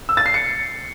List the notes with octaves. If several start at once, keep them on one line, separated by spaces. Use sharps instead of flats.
E6
A6
C7
C#7